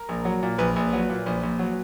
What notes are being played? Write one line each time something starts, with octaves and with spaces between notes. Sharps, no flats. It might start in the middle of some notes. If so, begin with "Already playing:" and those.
Already playing: A#4
A#1
F#3
A#2
A#1 B4
A#1
F#3
A#2
A#1
A#1
F#3